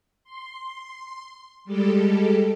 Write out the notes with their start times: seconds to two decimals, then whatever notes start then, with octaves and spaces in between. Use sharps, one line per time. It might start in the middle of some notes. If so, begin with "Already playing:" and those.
0.24 C6
1.65 G3 G#3 G4 A4